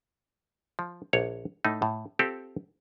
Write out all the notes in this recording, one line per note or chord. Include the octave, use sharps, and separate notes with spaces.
F3
A#1 C#5 F#5
A2 A3 D#4
A2
C4 F4 G4 A4